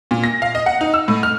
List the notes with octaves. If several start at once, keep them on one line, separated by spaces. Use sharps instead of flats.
A#2
A#6
F5
D#5
F#5
D#4
E6
A2
F6